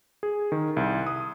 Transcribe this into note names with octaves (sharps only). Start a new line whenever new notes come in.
G#4
D#3
C2
D#6